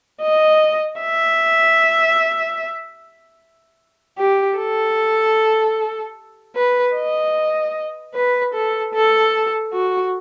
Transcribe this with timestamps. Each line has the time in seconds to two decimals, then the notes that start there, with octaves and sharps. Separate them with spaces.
0.21 D#5
1.00 E5
4.18 G4
4.58 A4
6.55 B4
6.95 D#5
8.14 B4
8.54 A4
8.94 A4
9.73 F#4